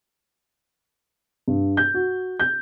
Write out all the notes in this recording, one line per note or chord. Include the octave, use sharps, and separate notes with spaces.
G2
G6
F#4
G6